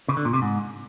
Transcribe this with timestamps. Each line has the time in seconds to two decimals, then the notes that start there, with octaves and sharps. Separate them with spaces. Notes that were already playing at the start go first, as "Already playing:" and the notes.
0.08 C#3
0.17 D3
0.25 A#2
0.34 C3
0.42 G#2